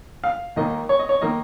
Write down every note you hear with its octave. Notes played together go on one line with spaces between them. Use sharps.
F5
D#2 D#3 A#3 D#5
C#5
D#5
C#5
D#3 A#3 D#5